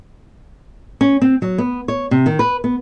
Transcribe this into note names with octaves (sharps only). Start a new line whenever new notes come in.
C#4
C4
F#3
B3
C#5
C3
D#3
B4
B3